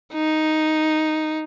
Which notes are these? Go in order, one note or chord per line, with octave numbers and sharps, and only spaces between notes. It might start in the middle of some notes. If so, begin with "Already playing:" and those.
D#4